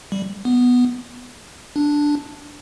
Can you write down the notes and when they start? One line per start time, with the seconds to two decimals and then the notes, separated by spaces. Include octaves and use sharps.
0.12 G3
0.45 B3
1.76 D4